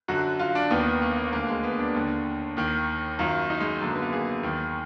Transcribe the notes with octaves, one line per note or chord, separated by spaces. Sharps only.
F#2 D3 F#4
F4
D4
D#2 D#3 B3
A#3
A#3
D2 D3 A#3
G#3
B3
D4
D#2 D3
D#2 D#3
F#2 D#3 F4
D#4
G#3
F#2 D3 A#3
B3
A#3
G#4
D#2 D#3